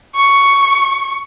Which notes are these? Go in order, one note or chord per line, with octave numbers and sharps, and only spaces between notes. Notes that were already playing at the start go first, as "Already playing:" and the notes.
C#6